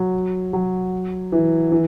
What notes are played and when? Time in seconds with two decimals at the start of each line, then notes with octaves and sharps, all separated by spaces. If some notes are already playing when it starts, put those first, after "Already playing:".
Already playing: F#3
0.53 F#3
1.32 E3
1.72 E3